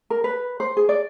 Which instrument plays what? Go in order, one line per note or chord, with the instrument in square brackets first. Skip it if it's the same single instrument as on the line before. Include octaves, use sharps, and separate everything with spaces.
[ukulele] A#4
B4
C5
G#4
D5